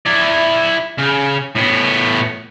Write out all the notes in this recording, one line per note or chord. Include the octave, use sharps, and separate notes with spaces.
E4 D5
C#3
A2 B3